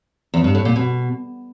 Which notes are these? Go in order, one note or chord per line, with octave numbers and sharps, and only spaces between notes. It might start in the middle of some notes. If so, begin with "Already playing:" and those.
E2
G2
A2
A#2
B2